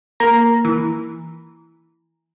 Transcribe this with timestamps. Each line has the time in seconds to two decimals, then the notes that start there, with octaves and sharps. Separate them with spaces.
0.20 A#3 A#5
0.65 E3